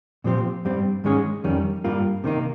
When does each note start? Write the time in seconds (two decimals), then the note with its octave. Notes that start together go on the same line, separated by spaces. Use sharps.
0.24 A#2 F3 C4 G4 C5
0.65 G2 G3 C4
1.04 G#2 D#3 G#3 C#4 G#4
1.44 F2 D#3 G3 C#4
1.84 G2 G3 A#3 F4
2.24 C3 D#3 A#3 D#4